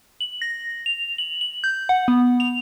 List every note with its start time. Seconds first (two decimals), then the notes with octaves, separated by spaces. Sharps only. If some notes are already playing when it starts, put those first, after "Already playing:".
0.21 F#7
0.42 A#6
0.86 F7
1.18 F#7
1.41 F#7
1.64 G6
1.89 F#5
2.08 B3
2.40 F7